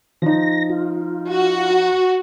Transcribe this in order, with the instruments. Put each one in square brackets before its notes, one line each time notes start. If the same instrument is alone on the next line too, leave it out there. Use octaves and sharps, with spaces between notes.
[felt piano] F3 D#4 [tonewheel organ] A#6
[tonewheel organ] F4
[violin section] F#4